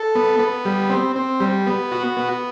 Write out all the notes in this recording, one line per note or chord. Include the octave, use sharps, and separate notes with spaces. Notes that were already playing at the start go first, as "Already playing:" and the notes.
Already playing: A4
B3
B3
G3
C4
C4
G3
B3
F#4
B3